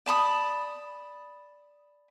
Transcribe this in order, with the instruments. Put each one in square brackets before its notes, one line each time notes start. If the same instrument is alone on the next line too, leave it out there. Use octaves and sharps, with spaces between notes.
[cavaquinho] D5 A5 B5 D#6